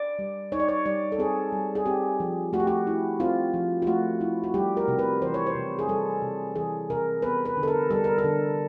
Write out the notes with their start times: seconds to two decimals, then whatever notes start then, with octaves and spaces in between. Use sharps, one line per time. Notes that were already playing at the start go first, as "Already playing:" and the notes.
Already playing: D5
0.19 G3
0.52 D#4 C#5
0.60 D5
0.69 C#5
0.86 G3 D5
1.12 A4
1.18 C4 G#4
1.52 G3
1.75 G#4
1.86 C4 G4
2.20 F3
2.53 A3 F#4
2.60 G4
2.67 F#4
2.87 E4
3.20 C4 F4
3.54 F3
3.82 F4
3.87 A3 F#4
4.21 E4
4.44 F#4
4.54 G3 G4
4.77 A#4
4.88 C3
4.99 B4
5.22 E3 C5
5.34 C#5
5.47 C5
5.55 C3
5.79 G#4
5.88 G3 A4
6.22 C3
6.55 E3 G#4
6.90 C3 A#4
7.22 B3 B4
7.45 B4
7.57 D3
7.63 A4
7.68 A#4
7.91 G3 A4
8.04 A#4
8.18 A4
8.24 D3